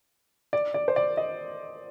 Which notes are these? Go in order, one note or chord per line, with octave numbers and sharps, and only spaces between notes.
D5
D5
C5
D5
D#5